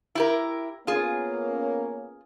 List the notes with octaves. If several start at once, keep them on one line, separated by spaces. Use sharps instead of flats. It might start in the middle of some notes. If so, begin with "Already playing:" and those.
E4 G4 A#4
A#3 B3 C#4 F4 G#4